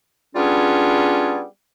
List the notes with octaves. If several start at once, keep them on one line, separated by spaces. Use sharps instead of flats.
G3 B3 C#4 D4 F4 G#4